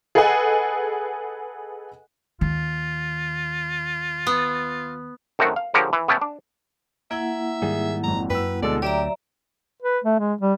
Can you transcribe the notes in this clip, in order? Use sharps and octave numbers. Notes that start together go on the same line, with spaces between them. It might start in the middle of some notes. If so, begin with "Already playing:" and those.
G#4 A4 B4 D#5 F#5 G#5
D#2 D#3 F4
B3
F#2 D#3 A3 C4 F#4
F5
D3 F3 G4 G#4 A#4 C#5
E3
B3 C#4 E5 G5 A5
D4
A#3 E4 E5 F#5 G#6
G#2 D#3 G3 G#4
G#1 F2 A#5
F#2 B4 G5 E6
D2 B2 G#3 A4 D5
F#3 G4 D5 E5 A#5
B4
A3
G#3
G3